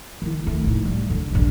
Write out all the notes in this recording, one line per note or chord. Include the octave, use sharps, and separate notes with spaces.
D#3 E4
D#3 A3
A2 D#4
G3
D3
A#1 G2